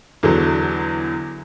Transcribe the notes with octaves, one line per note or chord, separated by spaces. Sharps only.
E2 D3 F#3